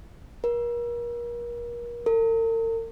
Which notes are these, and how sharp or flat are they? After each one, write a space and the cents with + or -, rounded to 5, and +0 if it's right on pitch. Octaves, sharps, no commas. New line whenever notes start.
A#4 +35
A#4 -45